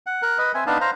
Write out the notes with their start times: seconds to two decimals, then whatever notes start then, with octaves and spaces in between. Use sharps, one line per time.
0.06 F#5
0.22 A#4 F#6
0.38 B4 D#5
0.54 C4 E5 G#5
0.67 B3 D4 D#4 B4 F5 A5
0.81 C5 F5 A#5